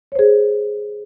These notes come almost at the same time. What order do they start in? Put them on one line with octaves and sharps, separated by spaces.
C#5 C5 G#4